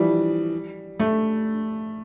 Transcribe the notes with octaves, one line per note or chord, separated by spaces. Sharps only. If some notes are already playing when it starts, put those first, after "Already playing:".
Already playing: E3 F3 G3
A3